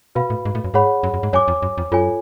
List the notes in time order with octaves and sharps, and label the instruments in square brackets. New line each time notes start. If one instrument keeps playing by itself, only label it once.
[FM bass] B2 [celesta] F#4 B4 F5 B5
[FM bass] A2
G#2
A2
F#2
[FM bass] G#2 [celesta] G#4 C#5 F#5 B5
[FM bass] F#2
F#2
G#2
[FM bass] F#2 [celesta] C#5 G#5 D6
[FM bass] F2
F#2
F2
[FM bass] F#2 [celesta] F4 A4 C#5 G#5